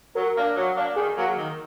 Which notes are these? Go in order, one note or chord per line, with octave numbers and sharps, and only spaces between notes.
F#3 A#4
A#3 D4
F#3
A#3 D4
D#3 G#4
F#3 A#3
D#3